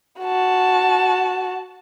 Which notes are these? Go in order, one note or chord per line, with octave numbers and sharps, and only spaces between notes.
F#4 A5